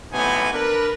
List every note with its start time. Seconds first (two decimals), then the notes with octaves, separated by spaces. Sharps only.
0.12 B1 A2 C3 B3 D#4 G#5
0.52 D4 A#4 B4